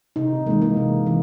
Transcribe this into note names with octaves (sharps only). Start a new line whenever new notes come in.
C3 D#4
E3 G#3 A#3
A#3
C3
E3